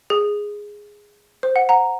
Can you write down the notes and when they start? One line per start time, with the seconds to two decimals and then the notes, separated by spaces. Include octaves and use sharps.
0.10 G#4
1.43 C5
1.56 F#5
1.69 F#5 A#5